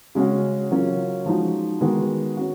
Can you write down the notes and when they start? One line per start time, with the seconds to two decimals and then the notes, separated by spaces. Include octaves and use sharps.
0.15 C#3 G#3 C#4 F#4
0.70 C#3 F#3 A#3 C#4 F4
1.26 F3 G#3 D#4 F#4
1.81 D#3 G#3 B3 F#4
2.37 C#4 F#4